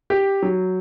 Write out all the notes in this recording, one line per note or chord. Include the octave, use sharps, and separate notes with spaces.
G4
F#3